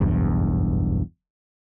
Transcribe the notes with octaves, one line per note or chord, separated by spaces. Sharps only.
F#1 B1 E2 G2